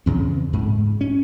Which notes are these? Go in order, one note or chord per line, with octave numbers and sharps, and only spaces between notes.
E2 C#3 C4
G#2
C#4